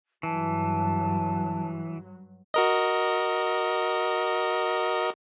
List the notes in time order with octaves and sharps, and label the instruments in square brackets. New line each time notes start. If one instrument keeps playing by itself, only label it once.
[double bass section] G2 F#3 [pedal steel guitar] E3 [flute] A5
[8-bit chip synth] F#4 A#4 D#5